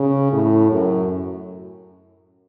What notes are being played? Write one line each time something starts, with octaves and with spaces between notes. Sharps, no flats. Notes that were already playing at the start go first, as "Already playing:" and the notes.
Already playing: C#3
A2
F#2